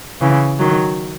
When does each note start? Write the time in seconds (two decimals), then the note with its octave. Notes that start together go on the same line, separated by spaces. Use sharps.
0.21 C#3 E3
0.59 D#3 F#3